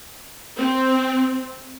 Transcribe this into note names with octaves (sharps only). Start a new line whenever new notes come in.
C4